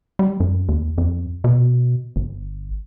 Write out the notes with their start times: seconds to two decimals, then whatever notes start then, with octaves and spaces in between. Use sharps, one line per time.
0.19 G3
0.40 F#2
0.69 D#2
0.98 F2
1.44 B2
2.16 G1